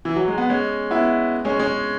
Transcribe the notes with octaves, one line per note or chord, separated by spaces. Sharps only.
E3
F#3
G#3
B3
G#3 C#4
B3 E4
G#3 C#4
G#3 C#4